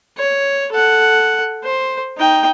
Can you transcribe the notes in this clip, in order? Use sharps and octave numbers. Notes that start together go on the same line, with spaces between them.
C#5
A4 F#5
C5
D#4 G5